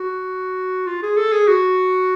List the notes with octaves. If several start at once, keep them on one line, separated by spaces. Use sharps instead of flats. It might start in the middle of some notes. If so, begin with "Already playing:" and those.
Already playing: F#4
F4
G#4
A4
G#4
F#4